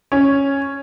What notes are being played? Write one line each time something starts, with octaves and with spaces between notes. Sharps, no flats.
C#4